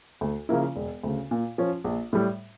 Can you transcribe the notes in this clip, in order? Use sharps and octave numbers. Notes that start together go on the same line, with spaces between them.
D2
C#3 F3 A#3 E4
E1
D2 C#3
A#2
F3 C#4
A#1
A2 G3